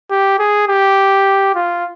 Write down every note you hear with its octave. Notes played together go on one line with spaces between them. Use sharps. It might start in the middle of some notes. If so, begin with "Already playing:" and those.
G4
G#4
G4
F4